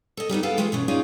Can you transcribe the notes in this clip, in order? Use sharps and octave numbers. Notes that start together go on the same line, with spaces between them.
A4 D#5
G3 B3 D#4 E4
B3 G#4 A4 F5 G5
E3 G#3 A3 E4 F4
B2 E3 C#4
C#4 D#4 F4 G#4 D5